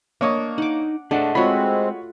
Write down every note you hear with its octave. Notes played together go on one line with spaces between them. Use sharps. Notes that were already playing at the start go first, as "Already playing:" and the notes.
A#3 D4 C#5 D#5
D#4 F#5 D6
A3 D4 G#4 D#5 F#5
G#3 C4 F4 F#4 C#5 B5